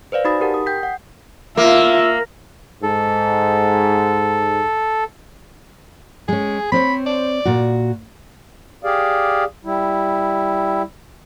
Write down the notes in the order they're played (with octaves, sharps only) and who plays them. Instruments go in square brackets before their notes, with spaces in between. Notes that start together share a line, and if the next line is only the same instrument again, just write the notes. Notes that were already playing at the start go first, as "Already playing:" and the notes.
[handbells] B4 C5 D5 F5
D#4 F#4 G#5 B5 D#6 A6
G4 A#4 F#5 A5
D#6
G5 G6 B6
F#5 C7
[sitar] A#3 [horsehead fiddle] F4 E5
[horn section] G#2 [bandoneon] A4
[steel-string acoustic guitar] G#3 C#4 [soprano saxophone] G#4
[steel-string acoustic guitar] C4 C5 C#5 [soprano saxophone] B5
[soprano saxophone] D5
[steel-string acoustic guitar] A#2 F#4
[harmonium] G4 G#4 D5 F5
G3 E4